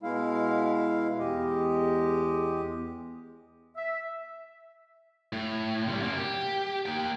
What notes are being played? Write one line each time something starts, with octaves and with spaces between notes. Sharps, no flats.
B2 G#3 E4 F5
E2 G#3 G4 D#5
E5
A2
C3 G3
F#2 A#3
G4
A#3 G5